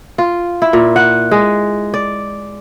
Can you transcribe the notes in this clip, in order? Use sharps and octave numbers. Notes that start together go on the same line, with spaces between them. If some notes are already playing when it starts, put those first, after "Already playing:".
F4
E4
A#2
F#5
G#3
D5